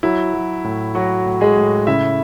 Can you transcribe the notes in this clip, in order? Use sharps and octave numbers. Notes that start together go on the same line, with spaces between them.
F#3 E4
F#3
A2
F#3 F#4
A2
G#3 G#4
A2
C#3 E4 E5